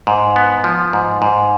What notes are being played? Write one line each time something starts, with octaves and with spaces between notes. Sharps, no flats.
G#2
B3
F3
G#2
G#2